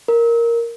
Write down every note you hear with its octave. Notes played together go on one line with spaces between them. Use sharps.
A#4